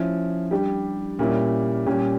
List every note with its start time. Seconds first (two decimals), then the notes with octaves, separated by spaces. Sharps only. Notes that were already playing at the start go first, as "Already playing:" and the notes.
Already playing: F3 C#4 E4
0.51 G3 D4 G4
1.19 A#2 G3 A#3 C#4 E4
1.86 A#2 G3 A#3 C#4 G4